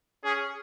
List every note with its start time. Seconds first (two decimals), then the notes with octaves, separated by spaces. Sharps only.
0.24 C#4 G#4